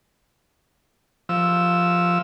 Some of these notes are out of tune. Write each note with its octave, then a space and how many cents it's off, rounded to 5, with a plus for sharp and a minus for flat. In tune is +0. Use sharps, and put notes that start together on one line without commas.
F3 +0 E6 +0